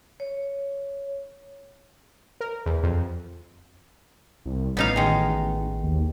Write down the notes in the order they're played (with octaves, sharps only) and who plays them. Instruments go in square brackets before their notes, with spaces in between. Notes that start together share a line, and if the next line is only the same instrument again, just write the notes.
[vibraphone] C#5
[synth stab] A#4
E2
F2
[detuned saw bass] C2
[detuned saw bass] A1 [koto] B3 D#4 F5
[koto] D#3 G#3
[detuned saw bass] D#2